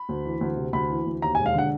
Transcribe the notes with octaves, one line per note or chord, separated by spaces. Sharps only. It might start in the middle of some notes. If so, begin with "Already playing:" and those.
Already playing: B5
D2
E3
D2
C3
D2 B5
E3
D2
D#2 A#5
G#5
E1
F5
D3 F#5